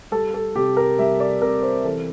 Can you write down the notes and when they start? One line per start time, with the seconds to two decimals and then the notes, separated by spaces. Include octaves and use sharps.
0.12 G3 A4
0.34 A4
0.56 C3 G4
0.77 A#4
0.99 G3 E5
1.20 D5
1.41 C3 A#4
1.63 C5
1.84 E3 A4